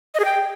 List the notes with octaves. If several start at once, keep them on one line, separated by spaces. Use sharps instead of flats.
D#5
G#4
G5